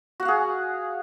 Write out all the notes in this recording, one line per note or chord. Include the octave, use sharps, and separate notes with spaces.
F#4 G#4 F5 F#5